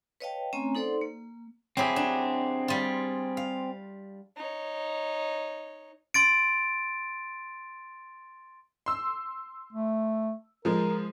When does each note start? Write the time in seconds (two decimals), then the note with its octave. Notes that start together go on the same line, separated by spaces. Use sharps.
0.20 B4 C#5 D#5 F5 G5 A5
0.53 A3 C4 C#4 C#5 G#5 A#5
0.75 D#4 A4 C5 D5 F#5 C6
1.01 A#3
1.77 F#3 C4 E4 G4 G#4
1.96 D4
2.68 G3 F4
3.37 F5
4.36 D#4 C#5
6.14 C6 A6 D7
8.86 C6 E6
9.73 A3
10.65 F3 G#3 A#4